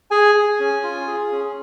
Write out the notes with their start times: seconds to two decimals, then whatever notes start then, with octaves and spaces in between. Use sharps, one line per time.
0.11 G#4 G#5
0.35 G#4
0.59 C#4
0.83 F4
1.07 G#4
1.32 C#4